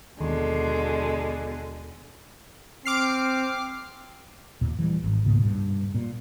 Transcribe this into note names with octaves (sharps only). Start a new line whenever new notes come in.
D#2 B2 D3 G#3
C4 D6 F6 C7
D#2 A#2
E3 F#3 G3
G#1
C#2 G#2 B2 A#3
G2
A#2